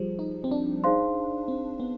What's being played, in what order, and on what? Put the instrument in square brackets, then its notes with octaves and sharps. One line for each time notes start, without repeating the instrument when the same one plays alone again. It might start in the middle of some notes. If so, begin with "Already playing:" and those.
Already playing: [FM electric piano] F3 G3 [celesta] F4 G#4 C5
[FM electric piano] D#4
C4
D4
[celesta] D#4 G#4 C5 F5 C6
[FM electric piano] C4
B3